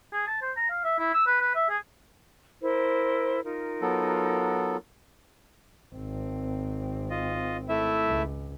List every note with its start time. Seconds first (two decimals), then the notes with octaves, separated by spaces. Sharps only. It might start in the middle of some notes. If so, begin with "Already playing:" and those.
0.13 G#4
0.27 A5
0.42 C5
0.56 A#5
0.70 F5
0.84 E5
0.99 E4
1.13 E6
1.27 B4
1.41 B4
1.55 E5
1.69 G#4
2.62 E4 A#4 C5
3.43 D#4 F4 A#4
3.82 F#3 B3 A4
5.95 G#1 C4
7.10 F4 D#5
7.69 A3 E4 E5
8.07 C#2